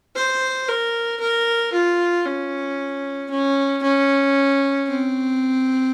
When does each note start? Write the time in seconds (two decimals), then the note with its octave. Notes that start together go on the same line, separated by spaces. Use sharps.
0.16 C5
0.68 A#4
1.21 A#4
1.73 F4
2.25 C#4
3.30 C#4
3.83 C#4
4.88 C4